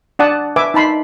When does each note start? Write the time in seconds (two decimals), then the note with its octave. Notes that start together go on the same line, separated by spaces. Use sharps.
0.19 D4 D5 F#5 A5 D#6
0.56 B4 E5 G#5 D6
0.74 D#4 A5 B5 C6